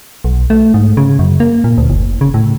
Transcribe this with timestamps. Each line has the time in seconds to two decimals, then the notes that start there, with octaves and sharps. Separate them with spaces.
0.24 B1
0.50 A3
0.74 G#2
0.97 C#3
1.19 F#2
1.40 A#3
1.64 A#2
1.78 D2
1.90 F#1
2.21 C#3
2.34 A2